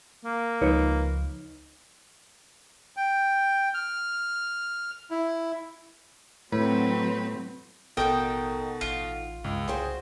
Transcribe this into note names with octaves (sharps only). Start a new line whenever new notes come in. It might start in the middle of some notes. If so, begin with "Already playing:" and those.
A#3
C#2 F3 D#4 B4 C#5
G5
F6
E4
A2 F#3 C4 B4
A1 B2 D#4 F#4 A4 A#4 D#5 G5
A1 F4
C#2 G2
C2 G3 F#4 G#4 C5 G5 C6